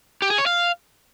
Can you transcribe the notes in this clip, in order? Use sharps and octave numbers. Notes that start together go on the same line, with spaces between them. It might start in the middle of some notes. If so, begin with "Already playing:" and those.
G4
G#4
C#5
F5